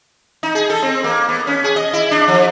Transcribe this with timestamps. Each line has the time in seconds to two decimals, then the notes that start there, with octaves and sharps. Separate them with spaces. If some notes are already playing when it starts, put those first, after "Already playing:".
0.43 D#4
0.55 G#4
0.70 A4
0.83 C4
1.04 A#3
1.29 B3
1.47 C#4
1.64 G#4
1.76 D#5
1.93 E4
2.11 D4
2.28 F3